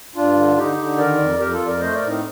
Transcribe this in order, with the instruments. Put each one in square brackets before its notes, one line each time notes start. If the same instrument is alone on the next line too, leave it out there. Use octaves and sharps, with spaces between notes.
[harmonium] G2 D4 F4
D3
D3 D#4 G4
D3
D#3 A#4 D5
F2
F2 G4 A#4
F4 A4
F2
A#4 D5
A3 C5 D#5
A#4 D5
A2
C4 D#4